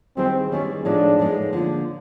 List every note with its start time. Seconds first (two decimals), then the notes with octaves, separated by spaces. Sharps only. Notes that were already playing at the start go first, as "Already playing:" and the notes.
0.17 D#3 G3 B3 C4 E4 G#4
0.51 D#3 G3 B3 C#4 E4 G#4
0.85 A2 F3 G#3 B3 D4 D#4
1.19 A2 F3 G#3 B3 D#4
1.53 D3 F3 A#3